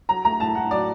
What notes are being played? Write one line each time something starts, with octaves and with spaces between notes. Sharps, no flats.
F#3 A#5
A3 A#5
A2 A5
A2 F#5
F#3 D5